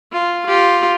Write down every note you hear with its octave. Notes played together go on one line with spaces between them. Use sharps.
F4
F4 G4